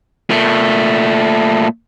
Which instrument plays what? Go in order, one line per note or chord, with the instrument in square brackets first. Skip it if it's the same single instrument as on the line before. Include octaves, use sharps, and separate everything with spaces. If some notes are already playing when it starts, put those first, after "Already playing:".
[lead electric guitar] A#2 A3